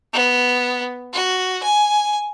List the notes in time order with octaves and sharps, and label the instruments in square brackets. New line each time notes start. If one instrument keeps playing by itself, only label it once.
[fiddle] B3
F#4
G#5